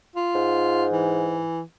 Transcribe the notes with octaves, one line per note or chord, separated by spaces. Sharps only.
F4
G#2
E3